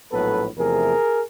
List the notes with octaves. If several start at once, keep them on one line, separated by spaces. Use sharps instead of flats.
A#1 A2 F#3 B3 A4 B4
E2 C3 F3 A3 G#4 A#4